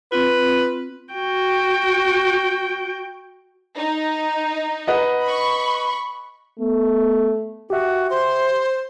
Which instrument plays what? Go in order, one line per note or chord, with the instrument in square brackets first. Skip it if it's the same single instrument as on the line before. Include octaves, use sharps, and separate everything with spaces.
[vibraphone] C4 F4 [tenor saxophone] B4
[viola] F#4 G5
[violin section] D#4
[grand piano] B4 D#5 F#5
[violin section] B5 C#6
[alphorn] A3 [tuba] B3
[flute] F#4 [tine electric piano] G4 E5
[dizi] C5 [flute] C6